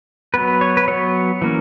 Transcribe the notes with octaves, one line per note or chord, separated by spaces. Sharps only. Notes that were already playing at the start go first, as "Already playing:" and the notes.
F#3 B3 B4
C#5
B4
F#3 B3 C#5
E3 A#3 C#4